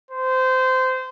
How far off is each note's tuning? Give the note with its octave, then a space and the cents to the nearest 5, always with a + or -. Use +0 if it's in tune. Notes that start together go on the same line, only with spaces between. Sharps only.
C5 -20